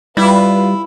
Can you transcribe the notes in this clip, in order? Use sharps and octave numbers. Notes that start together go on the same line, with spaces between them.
G3 E4 F4 B4